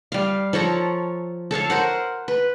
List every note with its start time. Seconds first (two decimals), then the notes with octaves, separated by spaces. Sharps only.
0.12 G3 F5
0.53 F3 A4 C#5 A#5
1.51 A4 C#5 F5 A5
1.70 A#4 C5 F#5
2.28 B4